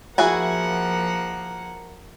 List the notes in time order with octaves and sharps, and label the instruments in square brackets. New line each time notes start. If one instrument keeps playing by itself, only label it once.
[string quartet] F3 A#3 F#5 [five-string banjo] E4 F#4 G#4